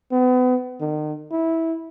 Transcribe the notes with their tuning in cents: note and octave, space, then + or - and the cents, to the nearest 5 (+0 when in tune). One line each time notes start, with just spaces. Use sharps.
B3 +35
D#3 -40
E4 -15